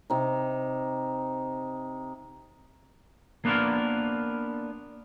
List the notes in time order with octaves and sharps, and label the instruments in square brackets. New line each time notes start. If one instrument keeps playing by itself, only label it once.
[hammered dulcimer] C3 D#4
[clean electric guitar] A#3 B3 D4 F4 A#4